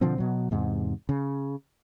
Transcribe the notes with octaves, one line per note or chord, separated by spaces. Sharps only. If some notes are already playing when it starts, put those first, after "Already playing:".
B2 D3 F3 C4
B2 F#3
E2 G#2 C3
C#3